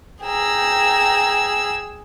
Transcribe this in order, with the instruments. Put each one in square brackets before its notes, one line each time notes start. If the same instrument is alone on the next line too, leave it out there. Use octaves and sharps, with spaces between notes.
[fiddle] G#4 E6 [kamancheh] G5 A#5